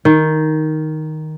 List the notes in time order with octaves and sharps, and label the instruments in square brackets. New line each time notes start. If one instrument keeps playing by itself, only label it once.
[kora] D#3